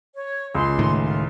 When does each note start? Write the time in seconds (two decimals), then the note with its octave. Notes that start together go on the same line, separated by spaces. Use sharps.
0.14 C#5
0.55 C#2 C#4 C6
0.79 A2 D#3
1.04 F4